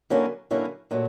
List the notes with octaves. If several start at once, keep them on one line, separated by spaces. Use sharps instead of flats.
D3 F#3 A#3 C#4 E4
D3 F#3 A#3 C#4 E4
A#2 F#3 A3